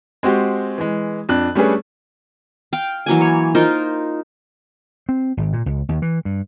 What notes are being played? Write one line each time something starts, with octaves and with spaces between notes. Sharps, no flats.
G#3 C4 F#4 G4
E3 G#3
F2 D4 F#6
G3 A3 C#4 D4 G#4 B4
F5 G5
E3 F#3 A#3 G#5
C#5
D#4 F4 A#4 C5
C4
G#1
A#2
C#2
D#2
E3
G2